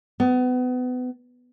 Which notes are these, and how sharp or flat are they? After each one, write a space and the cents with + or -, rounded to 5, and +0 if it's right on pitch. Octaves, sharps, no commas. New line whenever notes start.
B3 +30